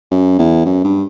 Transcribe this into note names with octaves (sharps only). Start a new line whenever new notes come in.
F#2
E2
F#2
G2